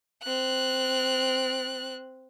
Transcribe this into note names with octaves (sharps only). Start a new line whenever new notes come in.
C4 F#6